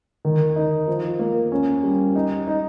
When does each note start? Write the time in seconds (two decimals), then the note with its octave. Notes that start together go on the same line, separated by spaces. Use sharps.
0.25 D#3
0.56 D#4
0.88 F3
1.19 A#3
1.52 C#4
1.83 G3
2.16 D#4
2.47 D#4